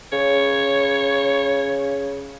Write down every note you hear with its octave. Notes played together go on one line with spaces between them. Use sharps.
C#3 C#5